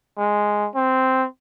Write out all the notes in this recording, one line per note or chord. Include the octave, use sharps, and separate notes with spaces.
G#3
C4